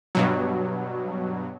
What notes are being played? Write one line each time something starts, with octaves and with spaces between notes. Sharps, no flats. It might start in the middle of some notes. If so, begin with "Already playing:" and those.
G2 B2 F#3